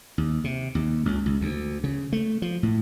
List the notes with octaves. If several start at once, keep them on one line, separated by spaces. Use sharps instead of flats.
D#2
C3
D#2
C#2
C#2
D2
C#3
A3
F3
A2